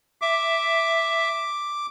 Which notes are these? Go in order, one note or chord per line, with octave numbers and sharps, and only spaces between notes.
E5 D6